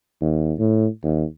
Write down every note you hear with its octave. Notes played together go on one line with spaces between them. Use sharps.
D#2
A2
D#2